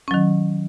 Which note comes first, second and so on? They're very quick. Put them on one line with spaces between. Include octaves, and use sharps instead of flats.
C#4 F#3 D#3